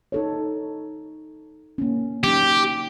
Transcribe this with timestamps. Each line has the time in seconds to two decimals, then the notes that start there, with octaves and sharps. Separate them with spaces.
0.12 D#4 A4 C#5
1.78 A#3 C#4
2.24 F#3 C#4 D#4 G4